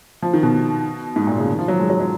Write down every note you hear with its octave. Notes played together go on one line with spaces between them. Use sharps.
F3
D#3
B2
G#2
A#2
C#3
D#3
F3
F#3
G#3
F#3
F#3